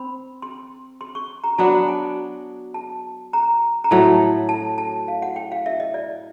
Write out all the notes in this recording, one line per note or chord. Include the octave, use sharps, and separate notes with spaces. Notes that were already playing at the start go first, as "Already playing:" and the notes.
Already playing: C4 B5
C6
C6
C#6
A#5
F#3 B3 D4 F#4 A5
G#5
A5
A#5
A#5
A2 F#3 A3 A5
A5
A5
F5
F#5
G5
F5
E5
D#5
D5